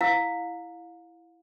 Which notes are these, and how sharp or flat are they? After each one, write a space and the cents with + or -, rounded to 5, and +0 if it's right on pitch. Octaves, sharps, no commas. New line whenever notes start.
E4 +10 F5 +30